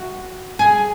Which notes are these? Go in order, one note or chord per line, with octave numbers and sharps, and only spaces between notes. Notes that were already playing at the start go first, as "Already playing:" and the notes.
Already playing: F#4
G#4